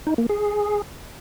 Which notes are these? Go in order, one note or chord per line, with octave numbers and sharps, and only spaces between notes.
D#4
A#3
G#4